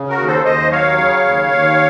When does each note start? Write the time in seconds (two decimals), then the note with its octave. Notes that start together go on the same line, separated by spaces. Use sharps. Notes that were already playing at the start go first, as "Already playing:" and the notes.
Already playing: C#3
0.09 F#4 A#4
0.18 D#2
0.26 A4 C5
0.44 D#2 C5 D#5
0.71 F#3 C#5 F5
0.97 C#3
1.25 D#2
1.51 D#2